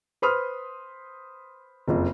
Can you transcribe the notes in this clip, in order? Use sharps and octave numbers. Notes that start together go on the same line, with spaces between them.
B4 C5 B5 C6 D#6 F6
F#1 F2